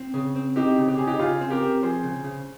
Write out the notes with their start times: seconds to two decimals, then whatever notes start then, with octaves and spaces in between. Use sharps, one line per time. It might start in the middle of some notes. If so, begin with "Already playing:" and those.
Already playing: C4
0.14 C#3
0.36 C4
0.56 C4 D#4 G4
0.78 C#3
0.88 G4
0.97 C#3 G#4
1.07 D#4 G4
1.19 C#3 F4 G#4
1.41 C4
1.50 G4 A#4
1.62 C4
1.82 F3 G#4 C5
2.03 C#3
2.24 C#3